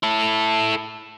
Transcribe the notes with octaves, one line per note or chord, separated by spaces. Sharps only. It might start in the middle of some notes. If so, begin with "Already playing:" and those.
E4 A4